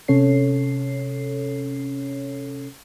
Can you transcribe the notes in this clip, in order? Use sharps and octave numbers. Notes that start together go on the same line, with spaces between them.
C3 C#4 A4 C#5 C7